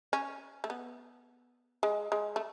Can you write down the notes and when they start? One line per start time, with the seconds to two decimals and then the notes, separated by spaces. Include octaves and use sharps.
0.13 C#4
0.64 A3
0.70 B3
1.83 G#3
2.12 G#3
2.36 A3